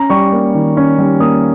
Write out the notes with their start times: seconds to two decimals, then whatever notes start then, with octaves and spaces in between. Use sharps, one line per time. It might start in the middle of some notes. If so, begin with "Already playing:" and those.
Already playing: C#4 A#5
0.10 G3 C#6
0.32 A#3
0.55 D#3
0.77 C#4
0.98 G3
1.20 A#3 D#6